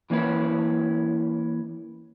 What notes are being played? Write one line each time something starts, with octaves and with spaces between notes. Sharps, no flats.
E3 A#3 C#4 E4 B4